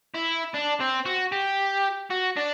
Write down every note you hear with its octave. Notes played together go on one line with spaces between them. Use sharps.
E4
D4
C4
F#4
G4
F#4
D4